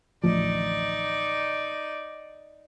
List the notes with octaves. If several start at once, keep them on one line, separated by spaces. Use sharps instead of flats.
A1 D2 F3 D#4 D5